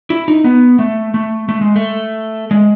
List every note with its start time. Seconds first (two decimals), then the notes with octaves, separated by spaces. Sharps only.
0.10 E4
0.28 D#4
0.44 B3
0.79 A3
1.14 A3
1.49 A3
1.61 G#3
1.76 A3
2.51 G#3